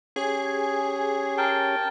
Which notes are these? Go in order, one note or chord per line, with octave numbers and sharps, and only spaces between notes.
C#4 G4 G#4 C#5
A#4 G5 A5